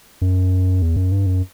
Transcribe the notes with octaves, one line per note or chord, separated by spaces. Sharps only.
F#2
E2
F#2
G2
F#2